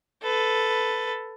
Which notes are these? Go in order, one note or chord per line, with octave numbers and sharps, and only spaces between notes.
A4 B4